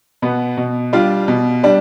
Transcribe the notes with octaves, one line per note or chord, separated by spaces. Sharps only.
B2 B3
B2
G3 D4 F4
B2
G3 D4